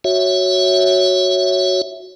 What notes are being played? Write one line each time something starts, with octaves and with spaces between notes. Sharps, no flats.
F#4 C#5 E5